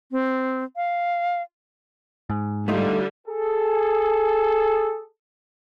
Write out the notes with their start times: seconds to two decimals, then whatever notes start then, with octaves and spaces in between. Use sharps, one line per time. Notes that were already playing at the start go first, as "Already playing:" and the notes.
0.11 C4
0.76 F5
2.30 G#2
2.68 D3 G3 A3 D#4 F4
3.27 G#4 A4